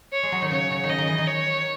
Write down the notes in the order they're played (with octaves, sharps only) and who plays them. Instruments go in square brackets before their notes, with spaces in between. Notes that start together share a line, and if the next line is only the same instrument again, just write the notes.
[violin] C#5
[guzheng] G#3
F#3
D#3
[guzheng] C#3 [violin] C#5
[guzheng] C#3
D#3
[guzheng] C#3 [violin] D#5
[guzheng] D#3
E3
D#3
[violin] C#5